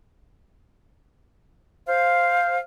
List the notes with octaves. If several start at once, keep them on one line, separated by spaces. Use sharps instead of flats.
C5 F5